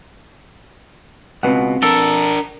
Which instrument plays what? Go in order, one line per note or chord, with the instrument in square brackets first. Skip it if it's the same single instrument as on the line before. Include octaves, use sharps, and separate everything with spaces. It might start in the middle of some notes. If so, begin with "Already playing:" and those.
[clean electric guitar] C#2 B2 [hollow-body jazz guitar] C4 B4 F#5
[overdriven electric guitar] D4 A#4 [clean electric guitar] A4